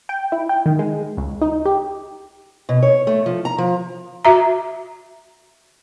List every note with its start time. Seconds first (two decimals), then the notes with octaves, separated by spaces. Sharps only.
0.09 G5
0.32 E4
0.49 G5
0.66 D#3
0.79 G#3
1.17 C#2
1.42 D#4
1.65 G4
2.69 B2
2.82 C#5
3.07 A3
3.26 F3
3.45 A#5
3.58 F3
4.25 F#4 E5 A#5